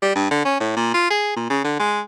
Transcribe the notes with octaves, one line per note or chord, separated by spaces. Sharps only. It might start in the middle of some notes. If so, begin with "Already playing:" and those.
G3
G2
D3
C#4
A2
A#2
F4
G#4
A#2
C#3
D3
G#3